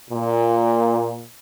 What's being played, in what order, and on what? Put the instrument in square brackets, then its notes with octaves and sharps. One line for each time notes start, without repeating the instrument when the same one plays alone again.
[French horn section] A#2